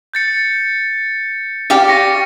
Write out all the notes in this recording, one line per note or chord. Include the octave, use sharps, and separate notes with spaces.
G6 A6 C#7
G4 D5 F5
C#6 A#6 C#7